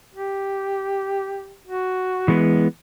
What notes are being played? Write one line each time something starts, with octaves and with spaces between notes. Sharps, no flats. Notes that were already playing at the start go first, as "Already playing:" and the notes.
G4
F#4
E3 G#3 B3